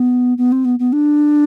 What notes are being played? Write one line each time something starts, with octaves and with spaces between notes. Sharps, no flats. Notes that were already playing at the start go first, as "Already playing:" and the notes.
Already playing: B3
B3
C4
B3
B3
D4